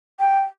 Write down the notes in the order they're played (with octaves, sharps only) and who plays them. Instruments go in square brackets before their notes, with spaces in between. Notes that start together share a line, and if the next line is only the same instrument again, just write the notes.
[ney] G5